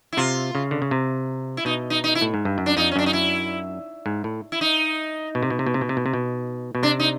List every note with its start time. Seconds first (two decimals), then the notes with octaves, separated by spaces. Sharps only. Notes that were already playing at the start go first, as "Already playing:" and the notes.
0.13 E4
0.17 C3 F4
0.55 C#3
0.71 D3
0.82 C#3
0.91 C3
1.57 E4
1.65 B2 D#4
1.90 D#4
2.04 D#4
2.15 E4
2.22 A2
2.34 G#2
2.45 G2
2.58 F#2
2.66 D4
2.77 F2 D#4
2.91 C#4
2.96 F#2 D4
3.06 D#4
3.13 E4
4.06 G#2
4.24 A2
4.52 E4
4.61 D#4
5.35 B2
5.43 C3
5.50 B2
5.59 C3
5.66 B2
5.74 C3
5.81 B2
5.89 C3
5.97 B2
6.06 C3
6.14 B2
6.75 B2
6.83 C3 D4
6.99 D#4